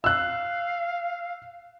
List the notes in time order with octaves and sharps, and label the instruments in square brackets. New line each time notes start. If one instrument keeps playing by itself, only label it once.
[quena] F5 [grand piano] E6 F#6